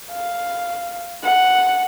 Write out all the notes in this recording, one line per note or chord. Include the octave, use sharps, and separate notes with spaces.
F5
F#5